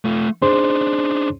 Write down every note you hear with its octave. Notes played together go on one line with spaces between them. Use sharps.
A3 F4
D4 D#4 G#4 C5 C6